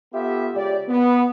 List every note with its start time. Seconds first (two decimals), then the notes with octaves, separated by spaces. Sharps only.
0.14 B3 F4 G4 A4 E5
0.55 C#2 G4 D5
0.89 B3